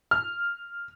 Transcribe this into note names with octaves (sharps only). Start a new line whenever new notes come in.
F6